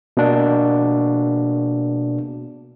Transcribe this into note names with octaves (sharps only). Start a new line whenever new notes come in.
B2 A#3 D4